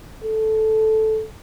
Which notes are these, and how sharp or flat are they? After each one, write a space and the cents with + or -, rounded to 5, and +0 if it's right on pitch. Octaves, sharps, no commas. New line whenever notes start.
A4 -10